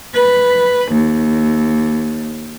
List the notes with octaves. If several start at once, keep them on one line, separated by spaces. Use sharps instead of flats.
B4
D#2